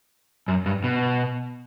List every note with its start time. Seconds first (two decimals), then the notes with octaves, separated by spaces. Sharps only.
0.48 F#2
0.66 G2
0.84 B2